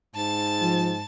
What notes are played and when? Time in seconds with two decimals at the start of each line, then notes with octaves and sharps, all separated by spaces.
0.15 G#2 A5 A6
0.62 F3